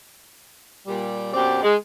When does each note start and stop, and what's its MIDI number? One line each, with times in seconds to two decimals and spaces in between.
0.87 1.30 46
0.87 1.30 55
1.34 1.62 42
1.34 1.62 47
1.34 1.62 60
1.34 1.62 67
1.34 1.62 74
1.63 1.75 56